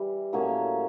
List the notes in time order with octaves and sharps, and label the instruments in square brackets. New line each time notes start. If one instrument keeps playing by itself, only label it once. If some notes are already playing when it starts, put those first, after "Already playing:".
Already playing: [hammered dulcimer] E3 G3
A2 F#3 A#3 C#4